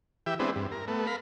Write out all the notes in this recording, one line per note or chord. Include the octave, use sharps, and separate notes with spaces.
E3 G4 E5
G#3 B3 C4 D4 E4
G2
A#4
A3 B3
A#4 F5 B5